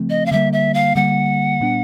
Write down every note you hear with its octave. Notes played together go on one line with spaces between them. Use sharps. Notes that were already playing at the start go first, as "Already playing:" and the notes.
Already playing: C#3 F3 A3 C4
D#5
F5
D3 G3 A#3 E5
E5
F5
D3 G3 A#3 F#5
A#2 G3 B3 D4